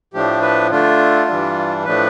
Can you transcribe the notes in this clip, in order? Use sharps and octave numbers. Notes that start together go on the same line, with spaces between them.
A2 F3 A3 D4 G4
B4
D3 A3 D4 F4
G2 E3 G3 D4
A2 F3 A3 D4 B4